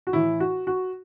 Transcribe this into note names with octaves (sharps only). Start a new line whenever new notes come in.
F#4
A2 E3 E4
F#4
F#4